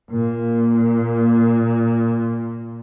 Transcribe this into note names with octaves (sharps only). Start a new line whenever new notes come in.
A#2 A#3